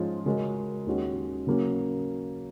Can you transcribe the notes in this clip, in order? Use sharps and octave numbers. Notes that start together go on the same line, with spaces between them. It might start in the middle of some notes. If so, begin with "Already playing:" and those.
Already playing: G#2 F3 G#3 C#4 F4
C#3 G#3 C#4 F#4 A#4
D#2 D#3 G#3 C#4 F#4
C#3 F#3 A#3 C#4